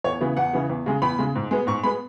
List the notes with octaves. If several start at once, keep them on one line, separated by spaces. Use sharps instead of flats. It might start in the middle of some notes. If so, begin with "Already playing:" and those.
E2 C#5
C#3 E3 B3
E2 F#5
C#3 E3 B3
E2
C#3 G#3
E2 B5
C#3 G#3
G#2
G#3 B3
G#2 C#6
G#3 B3 B5